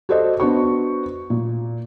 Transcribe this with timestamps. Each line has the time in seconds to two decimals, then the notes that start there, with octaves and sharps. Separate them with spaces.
0.09 F#4 G4 A4 C5 D5 D#5
0.40 B3 D4 F#4 C5 C#6
1.30 A#2